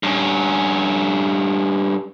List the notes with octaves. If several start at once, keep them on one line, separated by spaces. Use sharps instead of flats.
G2 C#4